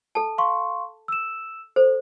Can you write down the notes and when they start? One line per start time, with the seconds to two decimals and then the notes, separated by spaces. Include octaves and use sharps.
0.15 A4 A5
0.38 F5 C6 C#6
1.08 E6 E7
1.76 A4 C5